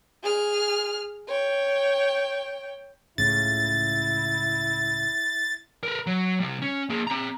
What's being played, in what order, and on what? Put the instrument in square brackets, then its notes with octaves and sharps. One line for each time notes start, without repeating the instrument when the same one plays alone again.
[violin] G#4 F6
C#5 G5
[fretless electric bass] C#2 A2 C#3 [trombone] E4 [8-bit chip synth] A6
[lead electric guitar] A#4 B4
F#3
C3 G3
C#4
A#3 G#4
C4 A#5